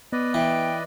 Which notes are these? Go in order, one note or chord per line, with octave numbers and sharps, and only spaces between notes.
B3 B4 D5 D#5
E3 G5